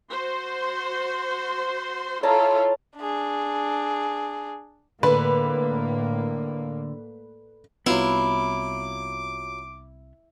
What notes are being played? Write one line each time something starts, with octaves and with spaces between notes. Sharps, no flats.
F#4 C5 C6
E4 F4 A4 C#5 A5 A#5
D4 G#4
A2 D3 A#3 B4
C2 F#3 B3 E4 F4 D6